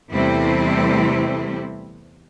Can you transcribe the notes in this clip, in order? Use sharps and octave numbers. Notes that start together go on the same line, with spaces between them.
E2 C3 G3 A3 C4 E4